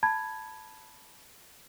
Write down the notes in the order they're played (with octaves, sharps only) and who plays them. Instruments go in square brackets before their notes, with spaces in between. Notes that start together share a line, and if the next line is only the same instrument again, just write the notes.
[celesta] A5 B5 G#6